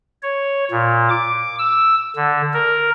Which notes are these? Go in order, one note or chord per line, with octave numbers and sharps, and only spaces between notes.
C#5
A#2
D6
E6
D3
A#4